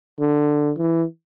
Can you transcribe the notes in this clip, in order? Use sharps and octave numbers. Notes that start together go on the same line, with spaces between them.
D3
E3